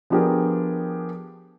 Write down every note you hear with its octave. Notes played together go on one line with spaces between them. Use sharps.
F3 B3 D4 G4 G#4 A#4